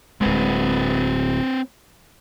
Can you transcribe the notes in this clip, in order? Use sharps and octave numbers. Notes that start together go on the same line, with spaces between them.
D1 G#3 C4 B4